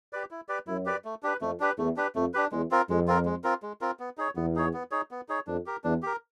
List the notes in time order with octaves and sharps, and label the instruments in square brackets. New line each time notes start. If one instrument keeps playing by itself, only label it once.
[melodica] G4 B4 D5
E4
G4 B4 D5
[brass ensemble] F#2 [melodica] E4
[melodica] G4 B4 D5
A3
D4 G4 B4
[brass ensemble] F2 [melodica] A3
[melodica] D4 G4 B4
[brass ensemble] E2 [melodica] A3
[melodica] D4 G4 B4
[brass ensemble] F2 [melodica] A3
[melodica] D4 G4 B4
[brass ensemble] E2 [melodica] G#3
[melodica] C4 F4 A#4
[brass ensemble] F2 [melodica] G#3
[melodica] C4 F4 A#4
G#3
C4 F4 A#4
G#3
C4 F4 A#4
B3
D#4 G#4 C#5
[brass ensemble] E2 [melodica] B3
[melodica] D#4 G#4 C#5
B3
D#4 G#4 C#5
B3
D#4 G#4 C#5
[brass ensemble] F2 [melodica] D4
[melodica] G4 A#4
[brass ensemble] E2 [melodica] D4
[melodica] G4 A#4